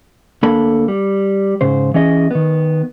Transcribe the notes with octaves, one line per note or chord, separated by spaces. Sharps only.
D2 A#3 D4 A4 B5
G3
G#2 C#3 C5
E3 C#4 G#4 D#5
D#3 B3